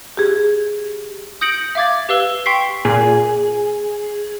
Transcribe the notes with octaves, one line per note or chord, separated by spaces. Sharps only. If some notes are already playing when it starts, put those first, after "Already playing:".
G4 G#4
D#6 G6 A#6 C#7 D7 F#7
E5 F5 D6 G#6 A6
G4 B4 F5 E6 G7
G5 C6 C#6 B6 C7
A#2 G#4